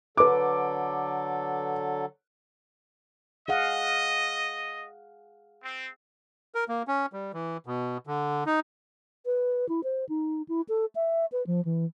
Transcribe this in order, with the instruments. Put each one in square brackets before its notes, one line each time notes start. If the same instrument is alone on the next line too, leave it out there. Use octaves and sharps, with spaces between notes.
[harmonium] D3 F#3 A4 [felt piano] B4 D6
[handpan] G#4 F5 F#5 [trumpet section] D#5
[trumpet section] C4
[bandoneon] A#4
A#3
C#4
G3
E3
B2
D3
D#4
[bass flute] B4
E4
C5
D#4
E4
A4
E5
B4
F3
E3